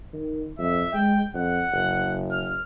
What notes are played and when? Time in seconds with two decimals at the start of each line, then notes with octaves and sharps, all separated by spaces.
0.13 D#3
0.59 F2 E5
0.94 G#3 G5
1.34 F2 F#5
1.72 F#1
2.32 F6